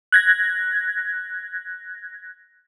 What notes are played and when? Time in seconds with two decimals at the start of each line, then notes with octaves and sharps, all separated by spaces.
0.12 F#6 G#6 A#6